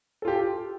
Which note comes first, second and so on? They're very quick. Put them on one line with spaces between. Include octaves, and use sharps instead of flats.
A4 F4 G4